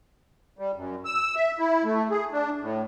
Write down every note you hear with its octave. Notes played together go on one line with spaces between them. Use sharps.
G3
F#2
E6
E5
E4
A3
G#4
D4
A2